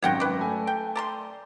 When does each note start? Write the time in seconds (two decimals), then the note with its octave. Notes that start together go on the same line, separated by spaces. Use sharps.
0.02 G#1 F#2 C#5 F#5 G5 A#6
0.20 B4 D5
0.40 A3 G#5
0.67 G5
0.95 D5 A#5 C6